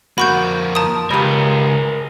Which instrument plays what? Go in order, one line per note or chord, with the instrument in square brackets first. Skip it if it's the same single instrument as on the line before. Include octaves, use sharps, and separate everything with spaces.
[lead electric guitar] F2 A#3 [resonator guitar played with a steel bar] F#4 [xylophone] B5 C#6 G6
[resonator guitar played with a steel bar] F3 A#4 [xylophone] A5 D#6
[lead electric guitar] C#2 [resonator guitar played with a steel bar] G3 G4 [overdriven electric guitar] G#4 A#4